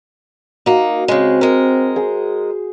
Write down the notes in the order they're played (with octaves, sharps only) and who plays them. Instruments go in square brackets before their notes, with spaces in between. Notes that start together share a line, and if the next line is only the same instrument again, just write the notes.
[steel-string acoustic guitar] A#3 D#4 [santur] F#4
[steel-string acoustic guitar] C#3 G#3 [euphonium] C4
[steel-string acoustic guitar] G#3 A#4
[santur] G#4 C5